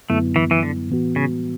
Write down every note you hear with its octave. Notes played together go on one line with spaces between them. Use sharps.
F#2 D3 F#3 A3 B3 E4
E3
E3
D3
A2 E3 B3 F#4
C#3